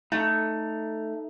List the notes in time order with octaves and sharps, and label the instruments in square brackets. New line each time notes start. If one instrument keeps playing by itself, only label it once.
[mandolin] A3 [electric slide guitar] D#4 A#5